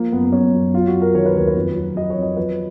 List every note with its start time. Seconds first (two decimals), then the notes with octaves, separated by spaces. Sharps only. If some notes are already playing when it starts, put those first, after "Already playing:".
Already playing: F3 A#3
0.12 F#2 B3
0.26 B3
0.32 F#2 C#4
0.54 F#2
0.74 F#3 F4
0.87 F#4
0.94 F#3
1.02 A#4
1.15 D#3 C#5
1.26 B4
1.35 D#2 A#4
1.48 B4
1.55 F2
1.76 F#3
1.96 F#3 D#5
2.10 C#5
2.17 F2 D#5
2.37 F3 B4